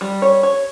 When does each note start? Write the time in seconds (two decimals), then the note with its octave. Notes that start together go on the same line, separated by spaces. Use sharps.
0.01 G3
0.22 C#5
0.43 C#5